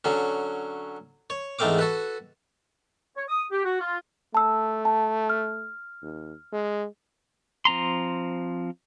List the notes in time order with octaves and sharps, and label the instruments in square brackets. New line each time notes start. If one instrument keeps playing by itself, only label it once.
[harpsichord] D3 F#3 C#4
C#5
E2 G#2 A3 C4 F5 D6
F#4 A4 B4
[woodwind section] C#5
D#6
G4
F#4
F4
[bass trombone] A3 [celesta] A5 E6
[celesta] A5
F6
[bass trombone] D#2
G#3
[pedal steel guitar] F3 C4 A#5 C6